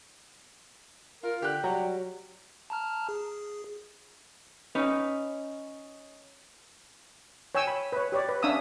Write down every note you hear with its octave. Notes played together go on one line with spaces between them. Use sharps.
F4 A#4
D3 G4 F#6
F#3 G3
A5 A#5 F6
G#4
C#4 D#4 B4
C#5 G5 G#5 E6
B5
B4 C#5
G4 C#5 D5
B4
C#4 D4 E5 F5 D#6 E6